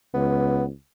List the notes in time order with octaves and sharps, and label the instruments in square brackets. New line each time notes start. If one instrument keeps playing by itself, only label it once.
[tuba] C#2 [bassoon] B3